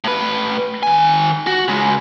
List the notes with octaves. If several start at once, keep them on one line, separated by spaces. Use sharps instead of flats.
A2 B4
D#3 G#5
F#4
C#3 G#3